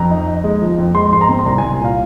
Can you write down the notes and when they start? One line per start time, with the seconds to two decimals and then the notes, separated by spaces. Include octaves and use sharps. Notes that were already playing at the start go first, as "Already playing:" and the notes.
Already playing: F2 A#5
0.11 D#4
0.27 D#4
0.44 G#3
0.62 F3
0.78 F2
0.94 G#3 C6
1.12 G#2 C6
1.21 A#5
1.29 C4
1.39 C6
1.46 C2 A#5
1.58 C2 G#5
1.80 A#2 F5